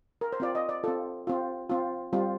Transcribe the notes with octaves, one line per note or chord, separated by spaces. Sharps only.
A#4
C5
C4 F4 D5
D#5
D5
C4 F4 A4
C4 F4
C4 F4
G3 C4 F4